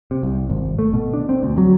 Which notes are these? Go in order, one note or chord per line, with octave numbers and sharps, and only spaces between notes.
C3
C2
G#1
A3
B2
D4
C4
D2
F#3